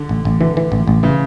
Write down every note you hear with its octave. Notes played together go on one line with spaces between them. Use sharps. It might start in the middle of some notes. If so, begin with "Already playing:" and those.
Already playing: D3
A1
A1
D3 E3
E3
A1
A1
C#3 E3